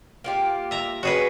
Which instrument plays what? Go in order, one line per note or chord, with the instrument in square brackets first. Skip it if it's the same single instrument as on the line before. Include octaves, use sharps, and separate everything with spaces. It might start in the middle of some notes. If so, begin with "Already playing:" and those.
[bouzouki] A#3 F4 G4
[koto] E5 A#5
[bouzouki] C#4 [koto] F#4 G#4 B4